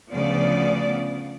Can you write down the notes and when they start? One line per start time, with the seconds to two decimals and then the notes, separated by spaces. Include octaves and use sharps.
0.12 D2 C#3 F3 B3 D5